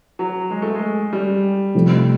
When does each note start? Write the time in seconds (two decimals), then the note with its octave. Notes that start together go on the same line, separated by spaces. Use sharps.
0.19 F#3
0.51 G#3
0.62 A3
0.75 G#3
1.13 G3
1.74 C3 F3 A3 C4